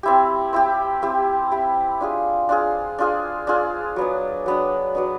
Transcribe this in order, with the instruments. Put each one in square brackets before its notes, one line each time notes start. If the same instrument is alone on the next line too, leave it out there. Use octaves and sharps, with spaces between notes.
[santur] C4 E4 G4
C4 E4 G4
C4 E4 G4
C4 E4 G4
D4 F4 G#4
D4 F4 G#4
D4 F4 G#4
D4 F4 G#4
F#3 B3 D4
F#3 B3 D4
F#3 B3 D4